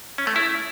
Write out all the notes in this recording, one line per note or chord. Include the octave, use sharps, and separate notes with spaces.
C#4
A3
E4